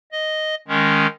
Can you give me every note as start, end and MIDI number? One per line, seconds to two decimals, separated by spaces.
0.12 0.55 75
0.68 1.07 51
0.68 1.07 56
0.68 1.07 61